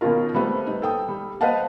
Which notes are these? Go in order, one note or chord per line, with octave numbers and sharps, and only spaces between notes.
B2 D#3 C#4 F4 A#4
G3 A3 B3 C4
D#4
A4 G5 D#6
G3
B4 C5 D#5 F5 F#5 A5